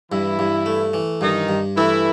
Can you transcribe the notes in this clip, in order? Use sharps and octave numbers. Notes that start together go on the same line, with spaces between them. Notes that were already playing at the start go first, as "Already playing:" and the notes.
G2 E3 E4
G2
A3
E3
G2 D#3 D#4
G2
E3 A3 E4